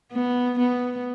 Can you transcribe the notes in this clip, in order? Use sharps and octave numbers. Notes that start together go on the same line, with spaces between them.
B3
B3